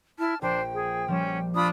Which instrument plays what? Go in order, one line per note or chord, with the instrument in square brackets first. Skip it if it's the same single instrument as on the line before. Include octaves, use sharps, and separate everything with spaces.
[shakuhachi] E4 [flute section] A5 F6
[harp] A#1 [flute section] D4 C5 [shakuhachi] G5
[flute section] G#4
[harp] F3 G3 E7 [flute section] C#4
[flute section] D4 F4 B5 [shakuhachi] D#6